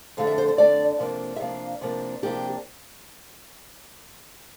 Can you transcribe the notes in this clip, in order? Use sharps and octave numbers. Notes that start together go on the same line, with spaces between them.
F2 D3 A3 D4 F5
E5
C5
C5
F2 D3 A3 D4 D5
C3 F3 A#3 D4
E5
C3 F3 A#3 D4 F5
C3 F3 A#3 D4
C3 F3 A#3 D4 G4